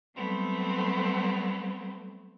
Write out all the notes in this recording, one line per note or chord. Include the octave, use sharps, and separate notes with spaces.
F#3 G3 A3 B3 C4